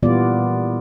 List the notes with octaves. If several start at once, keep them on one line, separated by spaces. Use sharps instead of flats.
A#2 E3 G3 B3 F4 D5